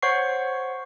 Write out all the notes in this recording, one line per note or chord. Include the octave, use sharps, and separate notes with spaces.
C5 C#5 F#5 C#6 C7